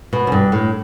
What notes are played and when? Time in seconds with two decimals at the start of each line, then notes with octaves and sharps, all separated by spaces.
0.13 B2
0.27 F#2
0.32 G2
0.52 A2